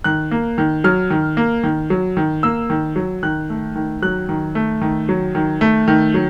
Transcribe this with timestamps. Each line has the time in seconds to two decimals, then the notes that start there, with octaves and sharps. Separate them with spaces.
0.04 D#3 F#6
0.32 A#3
0.58 D#3
0.84 F#3 F6
1.10 D#3
1.37 A#3
1.64 D#3
1.90 F#3
2.17 D#3
2.43 A#3 E6
2.70 D#3
2.96 F#3
3.23 D#3 F#6
3.50 A3
3.75 D#3
4.02 F#3 F#6
4.29 D#3
4.55 A3
4.82 D#3
5.09 F#3
5.35 D#3
5.61 A3
5.88 D#3
6.14 F#3